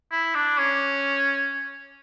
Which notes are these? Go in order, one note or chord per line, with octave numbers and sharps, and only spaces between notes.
E4
D4
C#4